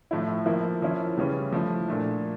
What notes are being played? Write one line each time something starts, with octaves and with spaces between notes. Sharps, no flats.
A2 F3 A3 E4
F3 A#3 E4
F3 C#4 E4
C#3 E3 G3 C#4
F3 A3 E4
A#2 A3 D4